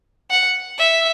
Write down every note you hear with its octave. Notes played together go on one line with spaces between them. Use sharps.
F#5
E5